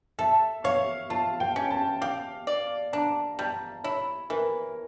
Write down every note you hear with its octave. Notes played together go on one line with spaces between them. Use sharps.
A4 E5
C#5 F5
F4 A5
G5
C#4
A5
G4 F5
D5
D4 A#5
G3 A5
E4 C#5
E3 A#4